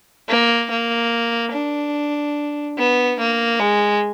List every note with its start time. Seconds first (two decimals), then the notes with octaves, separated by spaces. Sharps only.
0.28 A#3
0.70 A#3
1.52 D4
2.77 B3
3.19 A#3
3.59 G#3